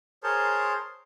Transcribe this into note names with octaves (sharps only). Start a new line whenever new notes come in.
G#4 A#4 C5 C#5 A5 C6